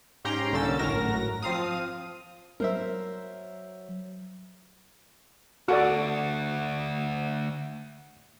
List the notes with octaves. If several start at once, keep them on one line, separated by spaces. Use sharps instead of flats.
G#2 C#4 G4 G5 A#5 C6
C2 D3 A#3 C#4 E6 A6
G#1 F#2 A2 F#4 A#4 A#6
F3 C4 F5 D#6
F#3 A#4 C5 E5
D2 F#4 A4 D5 F#5